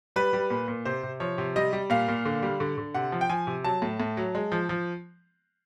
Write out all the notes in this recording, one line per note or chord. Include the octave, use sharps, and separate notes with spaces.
G3 B4
G3
A#2
A#2
C3 C5
C3
F3 C#5
C3
G3 D#5
G3
A#2 F5
A#2
D3
G3
D3
D3
C3 F#5
F3
G5
F3 G#5
C3
F#3 A5
A2
A2
F#3
G#3
F3
F3